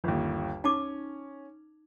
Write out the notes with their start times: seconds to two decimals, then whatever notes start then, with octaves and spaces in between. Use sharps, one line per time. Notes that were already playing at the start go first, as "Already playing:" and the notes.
0.04 G1 D#2
0.64 C#4 D#4 A5 D6